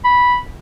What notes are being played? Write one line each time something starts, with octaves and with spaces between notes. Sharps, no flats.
B5